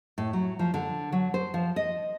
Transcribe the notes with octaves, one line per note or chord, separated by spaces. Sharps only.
A2
F#3
F3
D3
F#3
C5
F3
D#5